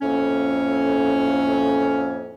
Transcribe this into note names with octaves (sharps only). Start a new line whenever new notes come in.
F2 A2 A#3 C#4